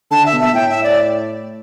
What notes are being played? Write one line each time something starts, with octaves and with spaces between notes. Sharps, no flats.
D3 A5
E5
B2
E5
A2 G5
E5
D5